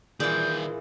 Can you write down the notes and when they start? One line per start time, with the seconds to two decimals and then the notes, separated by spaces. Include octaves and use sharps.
0.20 A#2 D#3 E3 F4 G#4 D5 G6